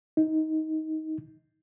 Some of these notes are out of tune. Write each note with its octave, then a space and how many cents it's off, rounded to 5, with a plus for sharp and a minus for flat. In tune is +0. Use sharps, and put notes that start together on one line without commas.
D#4 +15